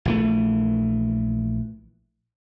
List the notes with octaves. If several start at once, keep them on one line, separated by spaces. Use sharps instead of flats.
A#1 E3 A3